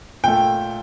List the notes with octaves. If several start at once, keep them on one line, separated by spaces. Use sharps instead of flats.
A#2 A3 G5